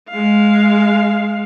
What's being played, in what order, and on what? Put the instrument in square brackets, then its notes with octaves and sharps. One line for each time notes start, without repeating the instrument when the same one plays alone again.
[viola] G#3 F5